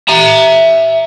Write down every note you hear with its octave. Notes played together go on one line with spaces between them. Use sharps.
E5 A#5